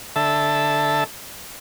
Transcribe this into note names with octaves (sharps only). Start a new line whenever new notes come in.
D3 A4 E5 A5